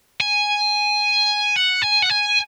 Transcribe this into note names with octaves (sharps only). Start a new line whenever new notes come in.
G#5
F#5
G#5
F#5
G#5